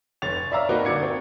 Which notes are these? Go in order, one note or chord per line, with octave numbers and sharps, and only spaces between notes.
F1 C#5 A6 F7
C#5
D5 E5 F5 A#5 E6
A#3 C4 D#4 F#4 A#4 B4
G1 D4 F#4 D6 G#6 C#7
C4